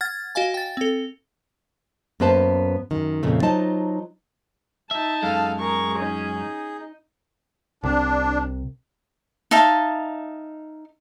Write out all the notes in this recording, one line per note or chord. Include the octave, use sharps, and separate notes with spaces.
F#5 F6 G#6 A6
F#4 D#5 F5 G#5
G5 A6
C4 A4
F#2 A#3 B3 B4 C5 A5
F#2 D#3
F2 A#2 C#3 A3
F#3 D#4 F4 C5 D#5 A5
D#4 E5 A5
F#2 G#3 A4 F5
G#4 A#4 C#6
C#4 D#4
D#4
C2 C3 D4
D#4 E5 F5 A5